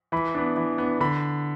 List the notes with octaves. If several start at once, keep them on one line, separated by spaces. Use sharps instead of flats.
E3 B5
B3 D4
E3
B3 D4
D3 B5